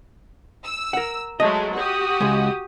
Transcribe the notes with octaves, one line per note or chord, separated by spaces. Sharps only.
E6
A#4 F#5
F#3 G#3 A3 D#5
F#4 G4 D#6
C#2 G#3